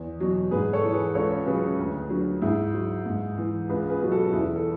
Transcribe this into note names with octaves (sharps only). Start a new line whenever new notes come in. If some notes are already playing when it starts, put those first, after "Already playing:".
Already playing: E2
B2 F#3
G#2 G#4 B4
A4 C#5
E3
G#4 B4
C#2 A4 C#5
C#3 F#3 G#4 B4
D2
D3 F#3
G#2 E4 G#4
F#3
G#2
E3
C#2 G#4 B4
G#4 B4
B2 F#3
F#4 A4
E2 E4 G#4
A4